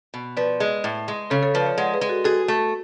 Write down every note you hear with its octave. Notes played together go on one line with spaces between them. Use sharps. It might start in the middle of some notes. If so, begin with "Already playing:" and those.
B2
F3 B4 D5
G#3
A2
G#3
C#3 A4 C#5
A4 C#5
F3 B4 D5
C#5 F5
G#3 D5 F#5
G#4 B4
G#3
F#4 A4
F#4 G#4 A4
A3